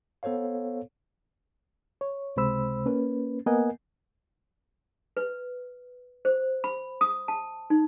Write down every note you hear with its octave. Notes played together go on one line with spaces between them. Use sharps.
B3 A4 C5 C#5 F5
C#5
C#2 C3 G#3 C5 B5 E6
A#3 C#4 B4
A#3 B3 A#4 D#5 F#5 G#5
B4
C5
B5
D#6
A5
D#4